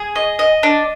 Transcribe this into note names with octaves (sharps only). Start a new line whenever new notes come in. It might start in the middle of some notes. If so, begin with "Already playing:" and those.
Already playing: G#4
D#5
D#5
D4